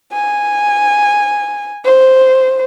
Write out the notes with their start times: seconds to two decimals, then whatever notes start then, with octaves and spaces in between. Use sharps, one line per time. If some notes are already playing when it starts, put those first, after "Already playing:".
0.13 G#5
1.85 C5